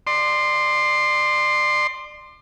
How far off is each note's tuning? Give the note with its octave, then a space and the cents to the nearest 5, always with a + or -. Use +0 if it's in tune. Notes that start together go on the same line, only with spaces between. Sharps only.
D5 +35 C6 +0